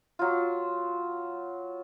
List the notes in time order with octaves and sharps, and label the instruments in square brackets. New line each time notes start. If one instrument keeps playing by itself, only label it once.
[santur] F#3 F4